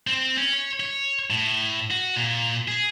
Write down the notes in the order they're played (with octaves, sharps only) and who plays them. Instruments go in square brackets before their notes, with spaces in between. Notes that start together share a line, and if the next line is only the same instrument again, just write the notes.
[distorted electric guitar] C4
C#4
C#5
C#5
A2
F#4
A#2
G#4